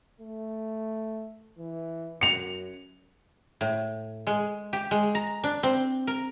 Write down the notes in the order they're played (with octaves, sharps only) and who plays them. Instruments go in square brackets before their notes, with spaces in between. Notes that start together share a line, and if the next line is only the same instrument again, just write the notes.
[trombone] A3
E3
[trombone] F#2 [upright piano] C#7 F7
[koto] A2
G#3
G4
G#3
A#5
D4
C4
A#4